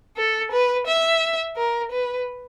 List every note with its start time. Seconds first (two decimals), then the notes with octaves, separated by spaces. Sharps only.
0.17 A4
0.52 B4
0.87 E5
1.57 A#4
1.92 B4